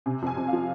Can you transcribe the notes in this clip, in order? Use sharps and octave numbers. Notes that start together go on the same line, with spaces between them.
C3 G#5
F2 G#5
F2
F5
F3